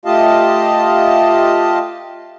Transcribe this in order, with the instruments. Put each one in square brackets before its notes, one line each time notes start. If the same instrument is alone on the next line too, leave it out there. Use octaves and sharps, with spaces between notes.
[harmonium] A3 F4 G4 D#5 F5 A5